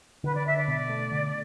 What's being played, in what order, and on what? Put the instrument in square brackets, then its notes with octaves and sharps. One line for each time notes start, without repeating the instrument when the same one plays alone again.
[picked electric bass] D3 [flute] B4
[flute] D5
[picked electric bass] D4 [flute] E5
[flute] D5
[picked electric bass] B2
A3
D3